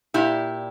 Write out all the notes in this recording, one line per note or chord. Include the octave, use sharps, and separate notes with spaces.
A#2 E4 G4